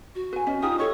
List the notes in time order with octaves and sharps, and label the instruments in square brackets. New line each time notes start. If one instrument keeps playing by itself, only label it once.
[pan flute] F#4
[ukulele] B4 G#5
C#4 D#5
[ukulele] D#4 F4 G4 [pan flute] D#6
[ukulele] A4 C#5 D#5 [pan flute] C#6